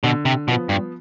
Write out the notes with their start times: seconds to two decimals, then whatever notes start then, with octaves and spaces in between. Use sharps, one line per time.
0.04 B2 D3
0.25 C3
0.48 B2 F3
0.51 B3
0.69 G2